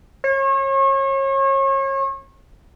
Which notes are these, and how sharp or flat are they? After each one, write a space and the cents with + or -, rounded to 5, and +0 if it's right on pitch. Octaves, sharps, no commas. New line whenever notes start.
C#5 -35